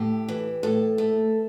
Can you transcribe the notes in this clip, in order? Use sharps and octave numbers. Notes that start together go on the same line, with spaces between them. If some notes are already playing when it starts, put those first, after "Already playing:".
Already playing: A2 G4
E3
A2 A4
A3